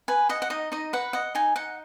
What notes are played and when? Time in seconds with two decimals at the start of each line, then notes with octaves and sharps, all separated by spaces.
0.08 B4 G#5
0.29 D#5 F#5
0.42 F#5
0.50 D#4 D#5
0.72 D#4 D#5
0.93 B4 F#5
1.13 D#5 F#5
1.35 D#4 G#5
1.56 D#4 F#5